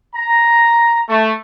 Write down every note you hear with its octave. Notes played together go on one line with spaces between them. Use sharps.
A#5
A3